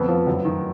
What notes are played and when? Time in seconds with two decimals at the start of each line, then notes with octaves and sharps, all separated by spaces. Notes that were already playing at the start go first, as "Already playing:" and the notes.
Already playing: F2 B3
0.08 F3
0.27 F#2
0.45 D#3